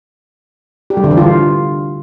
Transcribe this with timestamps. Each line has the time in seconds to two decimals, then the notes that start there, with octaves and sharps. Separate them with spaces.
0.90 G4
0.97 G3
1.04 D3
1.11 E3
1.17 F4